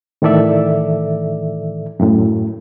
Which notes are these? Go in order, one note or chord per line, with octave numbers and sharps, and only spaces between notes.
A2 D#3 E3 A4 D5 E5
F#2 A2